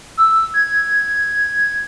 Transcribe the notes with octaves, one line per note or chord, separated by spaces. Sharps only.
E6
G#6